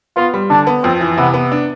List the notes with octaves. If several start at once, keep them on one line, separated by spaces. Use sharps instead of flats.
B3 F4
G3
D3 D4
B3
F2 C4
E3
C3 B3
B3
D4